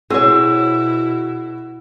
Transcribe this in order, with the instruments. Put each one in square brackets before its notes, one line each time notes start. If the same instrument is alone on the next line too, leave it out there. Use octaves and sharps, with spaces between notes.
[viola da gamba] B2 E4 [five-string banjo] C4 C#5 [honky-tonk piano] F#4 E6 [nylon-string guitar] G#4